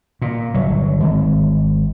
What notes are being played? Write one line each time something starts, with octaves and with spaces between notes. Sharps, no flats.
A#2
G1 F#3
G#1